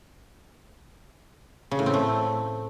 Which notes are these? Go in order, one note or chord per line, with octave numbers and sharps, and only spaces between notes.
C#3
A2
C4
A3